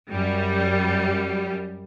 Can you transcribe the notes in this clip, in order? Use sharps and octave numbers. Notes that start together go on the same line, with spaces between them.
F#2 G3